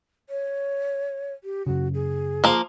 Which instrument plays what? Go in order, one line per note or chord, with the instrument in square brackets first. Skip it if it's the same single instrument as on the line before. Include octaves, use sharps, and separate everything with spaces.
[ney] C#5
G4
[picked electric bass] F#2 C#3 [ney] F#4
[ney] G#4
[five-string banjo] F3 A#3